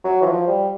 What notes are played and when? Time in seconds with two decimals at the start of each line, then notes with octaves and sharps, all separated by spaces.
0.04 F#3
0.22 E3
0.26 F3
0.47 G3